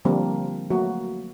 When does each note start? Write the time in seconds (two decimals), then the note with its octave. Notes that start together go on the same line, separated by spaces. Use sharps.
0.05 D3 F3 G3 A#3 C4 D4
0.70 F#3 A3 A#3 F#4